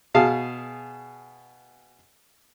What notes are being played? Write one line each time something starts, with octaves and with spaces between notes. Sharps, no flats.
B2 G#4 F5 A5